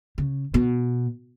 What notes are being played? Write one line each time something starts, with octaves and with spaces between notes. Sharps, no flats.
C#3
B2